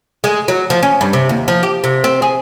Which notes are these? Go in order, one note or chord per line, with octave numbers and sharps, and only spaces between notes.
G#3
F#3
F3
C#4
G2
C3
D#2
F3
G4
C3
C4
G#4